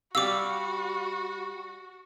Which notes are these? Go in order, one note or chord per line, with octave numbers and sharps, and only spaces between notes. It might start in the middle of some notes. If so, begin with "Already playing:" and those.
G3 F#4 G4 F5 D6 E6